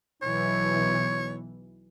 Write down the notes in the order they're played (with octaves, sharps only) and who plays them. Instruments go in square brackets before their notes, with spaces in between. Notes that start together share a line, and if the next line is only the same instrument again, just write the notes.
[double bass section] B1 B2 E3 [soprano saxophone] C#5